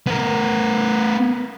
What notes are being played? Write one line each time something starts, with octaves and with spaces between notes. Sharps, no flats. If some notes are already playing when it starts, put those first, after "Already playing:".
B3 A#4